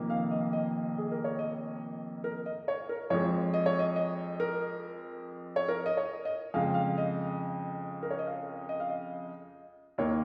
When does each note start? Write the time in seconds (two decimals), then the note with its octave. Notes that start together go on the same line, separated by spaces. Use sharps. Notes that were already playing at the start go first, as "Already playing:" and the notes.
Already playing: F1 F2 D#3 A#3
0.10 F5
0.31 D#5
0.53 D#5
0.98 G#4
1.11 A#4
1.24 C#5
1.39 D#5
2.24 A#4
2.46 D#5
2.68 C#5
2.89 A#4
3.10 F2 F3 G#3 C#5
3.54 D#5
3.66 C#5
3.79 D#5
3.96 D#5
4.40 A#4
5.56 C#5
5.68 A#4
5.86 D#5
5.97 C#5
6.25 D#5
6.54 F2 C#3 G#3 F5
6.74 F5
6.98 D#5
8.03 A#4
8.11 C#5
8.19 D#5
8.27 F5
8.69 D#5
8.80 F5
8.90 D#5
9.98 D#2 D#3 A#3 C#5